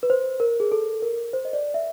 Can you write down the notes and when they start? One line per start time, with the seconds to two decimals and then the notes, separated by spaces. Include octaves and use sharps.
0.03 B4
0.10 C5
0.40 A#4
0.60 G#4
0.72 A4
1.02 A#4
1.33 C5
1.45 D#5
1.53 D5
1.74 E5